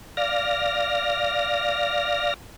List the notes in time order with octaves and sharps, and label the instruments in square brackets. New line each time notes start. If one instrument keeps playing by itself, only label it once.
[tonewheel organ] D5 F5 F6 A#6